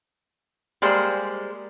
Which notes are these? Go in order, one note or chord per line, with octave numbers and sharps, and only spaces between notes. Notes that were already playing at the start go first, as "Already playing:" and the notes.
G3 G#3 A#3 C5